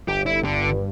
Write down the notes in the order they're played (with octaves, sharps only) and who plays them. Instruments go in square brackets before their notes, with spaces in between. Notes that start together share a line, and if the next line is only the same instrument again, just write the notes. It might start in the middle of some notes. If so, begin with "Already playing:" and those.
[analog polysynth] G1 [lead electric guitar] G4
[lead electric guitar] E4
[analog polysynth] G2 [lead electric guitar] D3